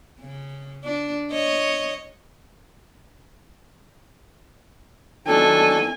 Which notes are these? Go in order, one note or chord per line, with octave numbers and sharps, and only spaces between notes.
C#3
D4
C#5 D#5
D#3 F#3 D4 A4 G#5